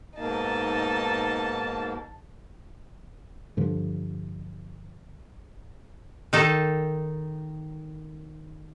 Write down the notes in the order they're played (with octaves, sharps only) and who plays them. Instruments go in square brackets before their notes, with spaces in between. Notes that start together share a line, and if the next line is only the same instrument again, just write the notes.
[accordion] G#2 B2 A#3 [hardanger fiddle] D#4 A5
[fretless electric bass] G2 D3 F3
[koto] D#3 D#4 A4